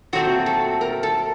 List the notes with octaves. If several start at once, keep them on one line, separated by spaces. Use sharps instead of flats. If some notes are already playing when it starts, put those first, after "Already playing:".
A#2 F#3 A3 C4 F#4
A4
A#4
A4